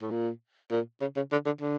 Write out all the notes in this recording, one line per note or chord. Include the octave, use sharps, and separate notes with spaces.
A2
A#2
A#2
C#3
C#3
D3
D3
D3